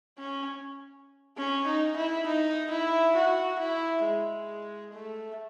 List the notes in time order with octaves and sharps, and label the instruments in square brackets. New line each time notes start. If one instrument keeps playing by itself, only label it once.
[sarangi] C#4
C#4
D#4
E4
D#4
E4
F#4
E4
G#3
A3